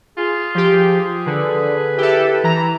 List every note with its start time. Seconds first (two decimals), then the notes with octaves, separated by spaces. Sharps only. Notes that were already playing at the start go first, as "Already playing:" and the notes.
0.17 F4 G#4
0.55 F3 G4
1.27 D3 B4
1.98 E4 G4 A4
2.44 E3 A#5